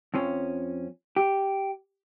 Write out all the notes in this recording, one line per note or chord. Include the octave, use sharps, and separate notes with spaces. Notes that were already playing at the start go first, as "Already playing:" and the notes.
F2 F3 C#4
G4